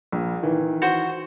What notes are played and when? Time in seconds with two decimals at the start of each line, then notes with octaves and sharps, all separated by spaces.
0.12 A#1
0.43 D#3 E3
0.82 F#4 C5